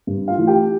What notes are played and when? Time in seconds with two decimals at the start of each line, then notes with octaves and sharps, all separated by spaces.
0.07 G2
0.28 F4 F5
0.38 E3 A3
0.47 G4 G5